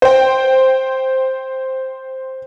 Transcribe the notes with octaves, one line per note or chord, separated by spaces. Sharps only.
C5 G5